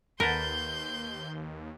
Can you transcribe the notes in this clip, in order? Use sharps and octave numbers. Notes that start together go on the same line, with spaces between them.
D#2 A#4 B4 F#5 A5 C6 G6